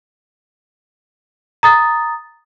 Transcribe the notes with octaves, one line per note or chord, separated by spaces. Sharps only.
A#5 D#6 A6